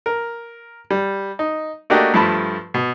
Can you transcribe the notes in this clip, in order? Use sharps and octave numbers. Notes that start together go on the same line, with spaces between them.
A#4
G3
D#4
A3 A#3 D4 F#4 G4 D#5
G2 F3 A3 A5 B5
B2